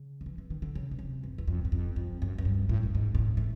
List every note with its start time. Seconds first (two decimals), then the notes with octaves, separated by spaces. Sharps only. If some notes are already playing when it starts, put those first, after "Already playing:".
Already playing: C#3
0.21 D#3
0.26 E3
0.38 E3
0.50 D#3
0.62 D3
0.75 C#3
0.91 B2
0.99 C3
1.23 F#2
1.38 E2
1.47 F2
1.65 F#2
1.72 F2
1.96 F2
2.22 F#2
2.38 F#2
2.45 G2
2.69 A2
2.83 G2
2.95 G#2
3.15 G#2
3.18 A2
3.37 A2